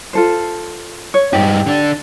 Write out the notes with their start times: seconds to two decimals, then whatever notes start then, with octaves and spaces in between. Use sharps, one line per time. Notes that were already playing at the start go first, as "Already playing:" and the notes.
0.13 F4 A4 C5
1.14 C#5
1.33 G2 D#4 G4
1.66 D3 D4